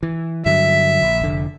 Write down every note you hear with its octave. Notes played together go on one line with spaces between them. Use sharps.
E3
G2 D3 F#3 E5
A#1
F1 D3